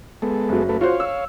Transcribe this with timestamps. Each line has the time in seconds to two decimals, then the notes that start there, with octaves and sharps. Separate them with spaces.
0.22 G#3 B3 A4
0.49 F#1 F#3
0.69 A3 A4 B4
0.81 F4 F#4 C5 C#5 F5
1.00 E6